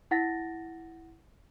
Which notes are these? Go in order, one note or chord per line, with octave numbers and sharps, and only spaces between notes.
E4 F#5 A6 A#6